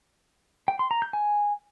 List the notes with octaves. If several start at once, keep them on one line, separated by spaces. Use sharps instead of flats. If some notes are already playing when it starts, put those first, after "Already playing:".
G5
C6
A#5
G6
G#5